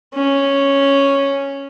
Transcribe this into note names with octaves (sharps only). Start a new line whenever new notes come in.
C#4